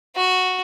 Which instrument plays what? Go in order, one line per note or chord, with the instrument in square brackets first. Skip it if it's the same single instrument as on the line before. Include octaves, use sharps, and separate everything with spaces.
[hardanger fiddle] F#4